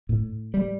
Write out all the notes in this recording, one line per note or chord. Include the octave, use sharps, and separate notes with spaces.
A2
G3